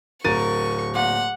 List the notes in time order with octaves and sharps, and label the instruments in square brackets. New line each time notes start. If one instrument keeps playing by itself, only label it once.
[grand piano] D1 A6 D#7 [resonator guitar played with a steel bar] A#4 [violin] C#6
[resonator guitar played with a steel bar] A#2 [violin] F#5